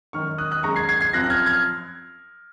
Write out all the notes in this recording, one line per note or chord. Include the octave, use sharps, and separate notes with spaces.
G#1 F#2 D#3 C#6 F6
D#6 F#6
D#6 F#6
F#2 D#3 G#3 A#5 C#6
G#6 C7
G#6 C7
G#6 C7
F#2 F3 C4 F#6 A#6
F#6
F6 G#6
F6 G#6